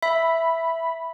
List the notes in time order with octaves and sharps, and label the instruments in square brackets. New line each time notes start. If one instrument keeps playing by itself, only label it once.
[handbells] E5 [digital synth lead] B5